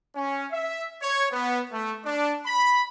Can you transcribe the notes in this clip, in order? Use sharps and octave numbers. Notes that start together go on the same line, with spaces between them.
C#4
E5
C#5
B3
A3
D4
B5